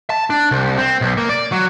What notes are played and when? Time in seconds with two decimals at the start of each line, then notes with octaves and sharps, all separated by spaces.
0.10 A5
0.30 D4
0.51 C2
0.78 C4
1.01 B1
1.17 A#3
1.29 D5
1.52 F#3